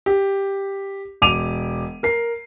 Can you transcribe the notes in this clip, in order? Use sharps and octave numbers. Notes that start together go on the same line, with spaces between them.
G4
E1 D6 D#7 F7
A#4 C7